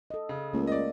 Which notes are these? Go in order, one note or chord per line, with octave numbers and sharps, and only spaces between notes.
A4 D#5
C#3
C#2 A3 A#3
D5 D#5